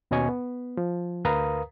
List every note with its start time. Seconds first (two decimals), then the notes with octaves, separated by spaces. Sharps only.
0.11 D#2 B2 C#4 D#5 G#5 C#6
0.29 B3
0.77 F3
1.25 D2 A#4 B4 F5 A#5 D#6